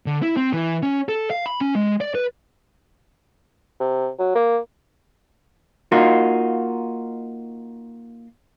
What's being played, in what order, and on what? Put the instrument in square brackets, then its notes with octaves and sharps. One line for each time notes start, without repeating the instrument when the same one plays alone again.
[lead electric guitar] D3
E4
C4
E3
C#4
A4
F5
B5
C#4
G#3
D5
B4
[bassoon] C3
F#3
A#3
[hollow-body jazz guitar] A#3 D#4 F4 F#4